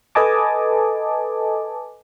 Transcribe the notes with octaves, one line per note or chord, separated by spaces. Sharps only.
A4 B4 D#5 G#5 A5 D6